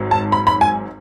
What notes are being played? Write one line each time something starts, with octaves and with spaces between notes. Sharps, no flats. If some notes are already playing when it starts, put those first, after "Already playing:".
Already playing: G#1 G#2 F#3
A5
B5
B5
G#5